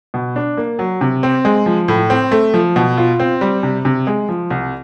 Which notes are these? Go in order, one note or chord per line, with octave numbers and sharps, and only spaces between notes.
B2
D4
A#3
F#3
C3
C4
G#3
F3
A2
C4
A3
F3
B2
F4
C4
G3
C3
C3
G#3
F3
C2